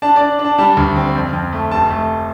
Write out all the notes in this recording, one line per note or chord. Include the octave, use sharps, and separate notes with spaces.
D4 A5
D4 D5
D4
A5
G3 A5
D2
C4
F2
F2
A3
F1 A5
A3